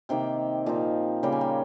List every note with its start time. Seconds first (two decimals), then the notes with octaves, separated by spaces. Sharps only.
0.09 C3 D#3 A#3 G5
0.66 A#2 F3 C4 D#4
1.23 C#3 G3 A#3 G5
1.32 G#5
1.41 G5